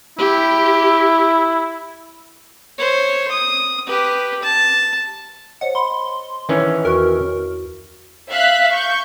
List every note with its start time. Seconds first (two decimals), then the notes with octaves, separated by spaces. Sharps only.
0.18 E4 G4
2.78 C5 C#5
3.31 D#6
3.87 G4 B4
4.43 A5
5.61 C5 C#5 D#5 F#5
5.75 B5 C6
6.49 D#3 E3 C#4
6.85 E2 F#4 A#4 C#6
8.30 E5 F5 F#6 B6
8.72 C#6 G6